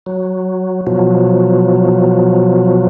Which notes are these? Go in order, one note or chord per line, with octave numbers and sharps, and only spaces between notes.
F#3
B2 F3 F#3